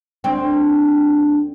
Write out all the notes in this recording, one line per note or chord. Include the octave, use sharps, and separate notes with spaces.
D2 C4